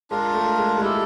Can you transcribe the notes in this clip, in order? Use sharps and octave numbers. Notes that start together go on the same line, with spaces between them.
G#3 D4 F4 A#4
A3
G#3
G#3
G3 E4 A4 D5